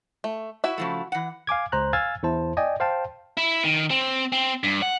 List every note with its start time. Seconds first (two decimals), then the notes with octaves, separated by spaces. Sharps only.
0.24 A3
0.64 E4 F#4 E5
0.78 C#3 F3 A3
1.12 E3 F#5
1.47 F5 G#5 D6 G#6
1.72 C#2 C5 A#5 F#6
1.93 F5 G#5 E6 F6 G#6 A6
2.23 E2 E4 C5 A5
2.57 D5 D#5 G5 G#5
2.80 C5 F5 G5 A5
3.37 E4
3.64 D#3
3.91 C4
4.32 C4
4.63 G2
4.82 F#5